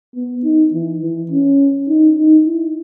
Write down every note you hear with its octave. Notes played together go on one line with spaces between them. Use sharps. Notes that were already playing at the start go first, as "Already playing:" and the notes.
B3
D#4
E3
E3
C#4
D#4
D#4
E4